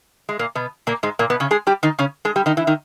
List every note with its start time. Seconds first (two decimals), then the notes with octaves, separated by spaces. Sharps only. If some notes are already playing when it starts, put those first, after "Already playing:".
0.29 G#3
0.39 A#2 A#3
0.55 B2 B3
0.87 A#2 A#3
1.03 G#2 G#3
1.19 A#2 A#3
1.30 B2 B3
1.40 C#3 C#4
1.51 G#3 G#4
1.67 G3 G4
1.83 D#3 D#4
1.99 C#3 C#4
2.25 G#3 G#4
2.36 G3 G4
2.46 D#3 D#4
2.57 E3 E4
2.67 D#3 D#4